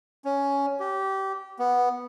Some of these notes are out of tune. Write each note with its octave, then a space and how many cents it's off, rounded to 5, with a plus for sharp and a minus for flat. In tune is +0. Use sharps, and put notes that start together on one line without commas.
C#4 +10
G4 -20
B3 -5